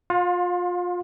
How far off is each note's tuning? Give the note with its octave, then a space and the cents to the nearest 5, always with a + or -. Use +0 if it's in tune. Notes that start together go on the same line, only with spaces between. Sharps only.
F4 +25 F5 +45 C6 +0